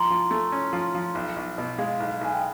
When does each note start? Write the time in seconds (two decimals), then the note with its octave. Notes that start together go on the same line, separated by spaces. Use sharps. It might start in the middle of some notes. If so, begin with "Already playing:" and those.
Already playing: F3 A#5 C6
0.10 F3
0.31 A3
0.52 C#4
0.73 F3
0.95 F3
1.15 B1
1.36 B1
1.58 B2
1.78 G#3 F5
2.00 B1
2.21 B1 G#5
2.34 G5